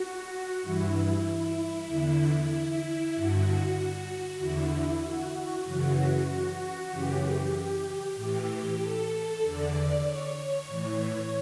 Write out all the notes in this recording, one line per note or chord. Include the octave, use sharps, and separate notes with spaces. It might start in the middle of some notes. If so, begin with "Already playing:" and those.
Already playing: F#4
G2 E3 E4
E2 D3
E4
G2 D3 F#4
E2 D3 E4
F#4
F#4
F#2 C#3 E3
F#2 C#3 E3 G4
A2 E3 G4
A4
E2 D3 D5
C#5
A2 E3